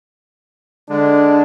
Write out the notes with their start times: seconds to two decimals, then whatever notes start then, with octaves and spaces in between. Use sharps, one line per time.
0.89 D3 G#3 D4